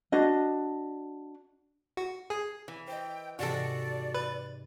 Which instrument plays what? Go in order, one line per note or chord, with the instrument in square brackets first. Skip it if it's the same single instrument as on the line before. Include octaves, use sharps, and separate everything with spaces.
[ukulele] D4 F#4 D#5
[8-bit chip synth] F#4
[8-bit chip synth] G#4 [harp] G#6 C7
[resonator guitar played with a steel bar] E3
[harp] C5 D#5 [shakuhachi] G5
[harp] G#2 C3 E3 [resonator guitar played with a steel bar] F#4 A4 [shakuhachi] D5
[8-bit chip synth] B4